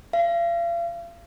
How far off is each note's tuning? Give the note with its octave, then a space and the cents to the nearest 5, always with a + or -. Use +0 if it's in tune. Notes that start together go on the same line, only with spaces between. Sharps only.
F5 -40